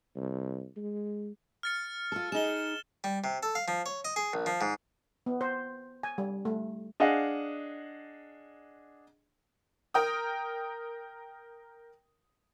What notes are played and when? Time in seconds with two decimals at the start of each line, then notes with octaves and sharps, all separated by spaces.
0.16 C2
0.77 G#3
1.63 F6 A6 C#7
2.12 F4 A4
2.32 D#4 G#4 E7 G7
3.04 G3
3.24 C3
3.43 A4
3.55 F5
3.68 F3
3.86 C#5
4.05 D#5
4.16 G#4
4.33 A#1
4.46 F3
4.61 G#2
5.26 B3
5.41 C5
6.03 G#5
6.18 G3
6.45 A3
7.00 D4 G#4 D#5 F5 F#5
9.94 A#4 G5 D#6